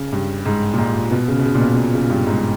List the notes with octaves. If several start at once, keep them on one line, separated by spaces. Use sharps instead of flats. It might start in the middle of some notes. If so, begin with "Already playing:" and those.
Already playing: C#3
G2
G#2
A#2
G#2
B2
C#3
B2
C#3
A#2
B2
A#2
C#3
G2
G#2